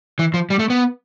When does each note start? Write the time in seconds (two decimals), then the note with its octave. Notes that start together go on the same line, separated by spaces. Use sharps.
0.19 E3
0.34 F3
0.50 G3
0.59 A3
0.70 B3